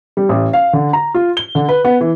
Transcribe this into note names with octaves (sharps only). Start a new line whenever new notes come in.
G3
A1
F5
D3
A#5
F4
G7
D3
B4
B3
E3